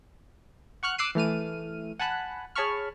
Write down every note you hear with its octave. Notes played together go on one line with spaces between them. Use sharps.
F#5 C#6 F6 F#6
D6 E6 F#6 C7 D#7
E3 A3 F6 D#7
F#5 G#5 A5 B5 F#6
G#4 C#5 A5 B5 C#6 F6